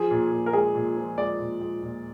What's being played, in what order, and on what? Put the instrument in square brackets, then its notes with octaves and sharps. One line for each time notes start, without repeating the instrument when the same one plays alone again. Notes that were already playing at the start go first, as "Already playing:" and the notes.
Already playing: [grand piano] F3 [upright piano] G#4
[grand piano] A#2
A#2
[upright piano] A#4
[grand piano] G#3 [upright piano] G#4
[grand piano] A#2
F3
[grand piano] G#3 [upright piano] D5
[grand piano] A#2
G#3
A#2